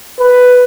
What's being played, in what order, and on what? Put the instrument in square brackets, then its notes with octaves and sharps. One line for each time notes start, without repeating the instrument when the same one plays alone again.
[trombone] B4